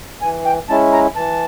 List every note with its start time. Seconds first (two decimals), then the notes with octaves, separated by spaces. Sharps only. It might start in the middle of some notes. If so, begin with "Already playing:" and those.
0.22 E3 G#5
0.46 G5
0.69 G#3 C#4 E4 A5
0.93 A#5
1.16 E3 A5